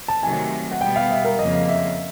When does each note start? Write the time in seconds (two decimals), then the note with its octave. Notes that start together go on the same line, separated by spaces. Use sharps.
0.08 A5
0.23 C3 D#3 F#3 A3 G#5
0.71 F#5
0.81 B2 G3 B3 G5
0.96 F5
1.11 E5
1.25 A#4
1.39 F2 C#3 F3 A#3 D#5
1.54 D#5
1.68 E5